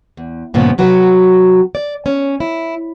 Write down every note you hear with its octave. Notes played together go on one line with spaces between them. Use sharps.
E2
G2 A#2 C#3 F3 B3
C3 F#3 F#4 B4
D5
C#4
E4